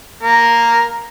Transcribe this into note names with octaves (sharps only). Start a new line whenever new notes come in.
A#3 A#4